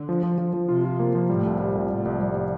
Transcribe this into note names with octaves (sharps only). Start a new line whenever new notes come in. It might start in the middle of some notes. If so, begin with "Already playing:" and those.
Already playing: D3
F3
F3
F3
F3
C3 F4
F4
A#3
F3
A2 G3
C2
G3
C2
C2 A2
C2
G3